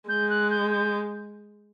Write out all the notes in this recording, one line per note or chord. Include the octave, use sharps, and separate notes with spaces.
G#3 G6
F#6
G6
G6